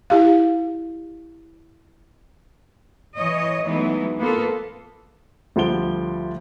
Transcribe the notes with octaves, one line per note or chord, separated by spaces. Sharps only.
E4 G4 F5
E3 C#5 D#5
E3 F#3 G#3 A3 B3 D#4
A#3 B3 F4 A4
D2 F3 G3 F#5 D7 G7